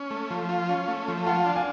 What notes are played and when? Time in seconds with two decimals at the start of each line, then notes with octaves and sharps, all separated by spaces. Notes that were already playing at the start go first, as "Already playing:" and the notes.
Already playing: C#4
0.11 A3
0.30 F3
0.49 F4
0.69 C#4
0.88 A3
1.08 F3
1.26 F4 F#5 A5
1.46 D4
1.55 F5 G#5